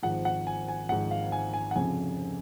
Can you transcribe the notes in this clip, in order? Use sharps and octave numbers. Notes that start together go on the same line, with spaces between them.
G#1 G#2 F3 F#5
F#5
G#5
G#5
G#1 G#2 F3 F#5
F5
G#5
G#5
F#5
F1 F2 C#3 G#5